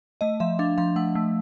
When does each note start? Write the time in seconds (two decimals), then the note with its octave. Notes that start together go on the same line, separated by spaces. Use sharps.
0.21 A3 D#5
0.40 F3 E5
0.59 D4 F5
0.78 F3 F5
0.96 A3 F#5
1.15 A3